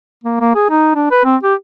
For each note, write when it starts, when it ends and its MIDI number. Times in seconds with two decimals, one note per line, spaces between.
0.24 0.37 58
0.41 0.52 58
0.55 0.65 68
0.70 0.94 63
0.95 1.09 62
1.11 1.24 71
1.25 1.36 60
1.43 1.54 67